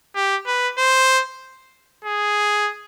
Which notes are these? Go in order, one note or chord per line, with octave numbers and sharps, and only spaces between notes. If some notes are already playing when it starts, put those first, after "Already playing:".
G4
B4
C5
G#4